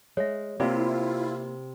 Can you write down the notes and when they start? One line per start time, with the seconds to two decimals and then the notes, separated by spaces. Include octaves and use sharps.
0.17 G#3 C#5 E5
0.60 C3 A#3 E4 F4 D5 F5